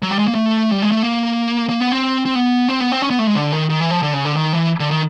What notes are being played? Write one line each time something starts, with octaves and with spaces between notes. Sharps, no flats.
F#3
G3
G#3
A#3
A3
G3
G#3
A3
A#3
A#3
B3
C4
C4
B3
C4
B3
C4
C#4
B3
A3
G#3
D3
D#3
D#3
E3
F3
D3
C#3
D3
D#3
E3
D3
D#3